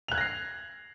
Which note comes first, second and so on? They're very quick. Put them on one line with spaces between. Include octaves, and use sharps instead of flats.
F7 F#6 G#6 A#6 C7